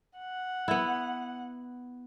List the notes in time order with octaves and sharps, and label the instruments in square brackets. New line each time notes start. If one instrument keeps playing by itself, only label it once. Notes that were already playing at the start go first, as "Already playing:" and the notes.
[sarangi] F#5
[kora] B3 E4